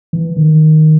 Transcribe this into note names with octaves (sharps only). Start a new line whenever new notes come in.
E3
D#3